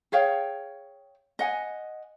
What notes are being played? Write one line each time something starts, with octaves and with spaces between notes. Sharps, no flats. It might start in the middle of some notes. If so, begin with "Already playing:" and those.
G#4 C#5 F5 G5
D#5 F#5 G#5